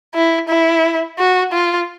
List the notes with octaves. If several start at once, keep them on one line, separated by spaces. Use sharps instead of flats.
E4
E4
F#4
F4